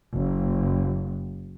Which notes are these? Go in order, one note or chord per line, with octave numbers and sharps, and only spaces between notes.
F#1